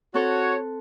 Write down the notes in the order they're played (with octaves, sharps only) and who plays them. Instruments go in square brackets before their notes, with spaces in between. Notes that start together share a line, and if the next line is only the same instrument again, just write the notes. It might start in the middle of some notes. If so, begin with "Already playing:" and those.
[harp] C4 A4 F#6 [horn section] F#4 C#5